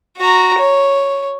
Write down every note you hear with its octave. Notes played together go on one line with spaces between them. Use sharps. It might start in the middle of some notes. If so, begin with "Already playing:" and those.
F#4 A#5
C#5